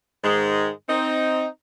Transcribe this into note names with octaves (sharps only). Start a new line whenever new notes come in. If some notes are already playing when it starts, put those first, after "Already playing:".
G#2 D#3 G#3
C4 D#4